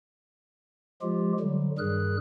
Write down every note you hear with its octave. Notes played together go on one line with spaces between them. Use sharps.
F3 G#3 F4 G4
D3 F#3 G3
G2 D#3 G3 G#4 A#4 F#6